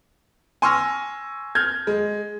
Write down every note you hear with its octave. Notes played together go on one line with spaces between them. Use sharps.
G#5 C6 C#6 E6 F6 A#6
F6 G6 G#6
G#3